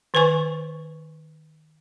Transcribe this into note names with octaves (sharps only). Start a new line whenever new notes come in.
D#3 B4 C5 G#5 C#6